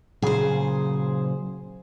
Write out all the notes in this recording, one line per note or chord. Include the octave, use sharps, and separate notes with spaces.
A#2 C#3 F#3 G#4 C5